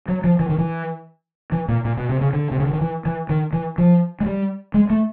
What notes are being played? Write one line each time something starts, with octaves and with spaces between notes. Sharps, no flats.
F#3
F3
E3
D#3
E3
E3
A#2
A#2
B2
C3
C#3
D3
C3
C#3
D3
D#3
E3
E3
D#3
E3
F3
G#3
G3
G#3
A3